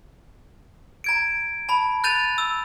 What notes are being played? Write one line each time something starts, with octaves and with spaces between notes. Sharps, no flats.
A#5 G#6 D7
A5 B5
F#6 G6 A6 D#7 F7
E6